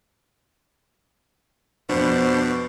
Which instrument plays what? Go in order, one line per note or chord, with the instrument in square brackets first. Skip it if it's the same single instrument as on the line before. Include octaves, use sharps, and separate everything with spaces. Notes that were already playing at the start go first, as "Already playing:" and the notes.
[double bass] F2 B3 [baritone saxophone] B2 [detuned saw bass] D4 [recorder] C5